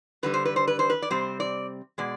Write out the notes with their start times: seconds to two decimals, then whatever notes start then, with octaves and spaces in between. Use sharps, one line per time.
0.23 G2 D3 G3 B4
0.34 C5
0.45 B4
0.56 C5
0.68 B4
0.79 C5
0.90 B4
1.02 D5
1.10 C3 G3 C4 C5
1.40 D5
1.98 B2 G#3 D5